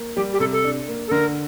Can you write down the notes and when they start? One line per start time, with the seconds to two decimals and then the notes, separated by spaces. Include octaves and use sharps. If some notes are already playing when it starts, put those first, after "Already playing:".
Already playing: A#3
0.16 G3 G4
0.33 G4
0.40 C3 A4
0.52 A4
0.64 D4
0.88 A#3
1.08 A4
1.11 D3 A#4